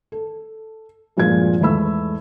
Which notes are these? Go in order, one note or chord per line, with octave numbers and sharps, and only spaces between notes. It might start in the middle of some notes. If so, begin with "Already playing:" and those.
A4
G2 A#2 F3 G#3 G#6
E2 G#2 A3 B5 E6